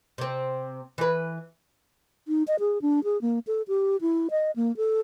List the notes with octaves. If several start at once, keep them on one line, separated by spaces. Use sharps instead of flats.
C3 C4
E3 B4
D#4
D#5
G#4
D4
G#4
A#3
A4
G4
E4
D#5
A#3
A4